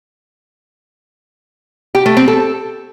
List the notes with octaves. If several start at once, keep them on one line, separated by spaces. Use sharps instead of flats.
G4
A3
C4
A4